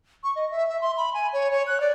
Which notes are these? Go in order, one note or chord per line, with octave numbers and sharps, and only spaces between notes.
C#6
D#5
E5
E5
C6
B5
G#5
C#5
C#5
F#6
D5